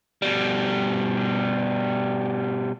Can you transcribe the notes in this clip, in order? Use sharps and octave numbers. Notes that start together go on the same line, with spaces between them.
B2 G3